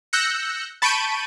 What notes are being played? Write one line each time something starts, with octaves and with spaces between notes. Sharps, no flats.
E6 F#6 G6 A#6 C#7
A5 B5 C#6 G6 D7 D#7